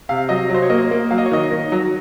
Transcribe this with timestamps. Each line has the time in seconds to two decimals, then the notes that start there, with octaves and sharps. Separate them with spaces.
0.09 C3 F5
0.29 F#3 D#5
0.50 F#3 C5
0.62 C#5
0.70 A#3 D#5
0.91 A#3
1.11 F#3 F5
1.18 D#5
1.26 C#5
1.31 D#3 D#5
1.51 D#3
1.72 F#3